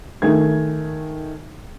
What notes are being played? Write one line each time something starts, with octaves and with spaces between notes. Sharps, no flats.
D#3 A3 G#4 G#6